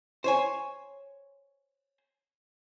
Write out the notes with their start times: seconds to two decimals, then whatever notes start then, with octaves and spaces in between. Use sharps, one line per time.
0.24 C5 C#5 G#5